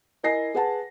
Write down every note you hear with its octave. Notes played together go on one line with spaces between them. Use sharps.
E4 A#4 D#5 G#5 A#6 C7
G#4 B4 F#5 A5